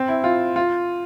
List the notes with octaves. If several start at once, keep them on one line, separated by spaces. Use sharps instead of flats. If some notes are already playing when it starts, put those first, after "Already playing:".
Already playing: C4
E4
F4
F4